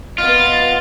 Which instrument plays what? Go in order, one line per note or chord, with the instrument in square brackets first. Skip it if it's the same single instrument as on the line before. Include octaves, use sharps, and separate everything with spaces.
[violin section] B3 D#5 A6 [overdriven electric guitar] F4